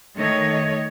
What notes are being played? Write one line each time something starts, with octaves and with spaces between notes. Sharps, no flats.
D#3 A3 C#5 D#5